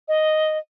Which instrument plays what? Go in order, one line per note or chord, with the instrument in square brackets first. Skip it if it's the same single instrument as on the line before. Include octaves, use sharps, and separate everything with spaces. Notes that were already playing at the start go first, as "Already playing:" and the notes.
[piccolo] D#5